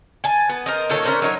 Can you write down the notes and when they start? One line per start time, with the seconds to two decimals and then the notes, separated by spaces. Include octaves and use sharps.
0.24 G#5 A5
0.49 B3
0.66 A#4 C5 D#5
0.89 A#2 D#3 A4 C#5
1.05 C#4 D4 A#4 C5
1.22 F#3 D#4 A#4 C#5